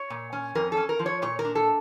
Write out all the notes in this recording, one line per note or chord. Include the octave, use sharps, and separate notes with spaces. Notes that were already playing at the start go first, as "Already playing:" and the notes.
Already playing: C#5
A#2
C#4
F2 A#4
A4
C#4
A#4
F3
C#5
A#2 C#5
A#4
D4
A4